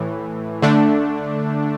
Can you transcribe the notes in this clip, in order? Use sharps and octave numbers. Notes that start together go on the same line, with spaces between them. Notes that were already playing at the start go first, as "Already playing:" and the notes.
Already playing: A2 E3
D3 A3 D4